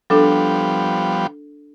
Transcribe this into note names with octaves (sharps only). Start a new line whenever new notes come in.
F3 G3 B3 D4 A4